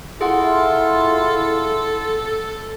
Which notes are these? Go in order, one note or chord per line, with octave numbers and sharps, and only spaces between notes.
E4 F4 G#4 A4 F#5 C6